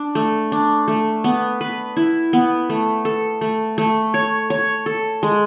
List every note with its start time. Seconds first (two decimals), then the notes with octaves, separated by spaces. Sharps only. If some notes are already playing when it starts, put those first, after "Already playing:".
Already playing: D4
0.15 A3
0.52 D4
0.88 A3
1.24 B3
1.61 B4
1.96 E4
2.33 B3
2.70 A3
3.05 A4
3.41 A3
3.78 A3
4.14 C#5
4.50 C#5
4.86 A4
5.23 G#3